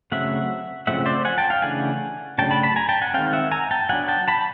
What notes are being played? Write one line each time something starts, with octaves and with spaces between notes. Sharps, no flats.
C#3 F#3 A3 C4 E5 F#5
C#3 F3 A3 C4 E5 F#5
C5 D5
F#5 G#5
G5 A5
F5 G5
C#3 E3 A3 D4 F#5 G#5
C#3 F#3 A3 D4 G5 A5
A5 B5
A5 B5
G#5 A#5
G5 A5
F#5 G#5
D#3 G#3 C4 F5 G5
E5 F#5
G#5 A#5
G5 A5
F#3 B3 D4 F#5 G#5
G5 A5
A5 B5